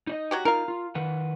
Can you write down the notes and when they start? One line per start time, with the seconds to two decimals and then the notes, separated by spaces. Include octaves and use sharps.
0.07 D#4 D5 D#5
0.31 F#3 F#4 G4
0.45 D#4 F4 A#4 F5
0.68 F4
0.95 D#3 B4 F#5